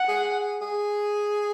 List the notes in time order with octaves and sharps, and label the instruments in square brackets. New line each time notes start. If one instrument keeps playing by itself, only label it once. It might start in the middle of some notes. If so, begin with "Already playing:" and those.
Already playing: [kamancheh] F#5
[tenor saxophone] G#4
G#4